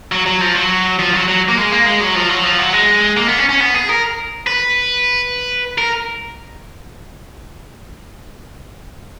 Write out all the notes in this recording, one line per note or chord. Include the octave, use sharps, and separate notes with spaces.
F#3
F#3
F3
F#3
F3
F#3
F#3
A#3
G#3
A#3
G#3
F#3
F3
F#3
F3
F#3
G#3
A#3
B3
C#4
C#4
B3
G#4
A#4
B4
A#4